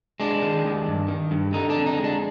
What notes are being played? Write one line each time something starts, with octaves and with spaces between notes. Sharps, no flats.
G#3 D4
D#3
D#2
G2
D#3
G2
D3 D#4
D4
F2
D#4
G#3
D4